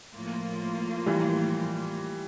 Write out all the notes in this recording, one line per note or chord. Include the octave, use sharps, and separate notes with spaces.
A2 F3 A#3 F4
E3 G3